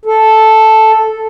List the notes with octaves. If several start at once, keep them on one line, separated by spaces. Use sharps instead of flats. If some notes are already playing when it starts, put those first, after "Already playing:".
A4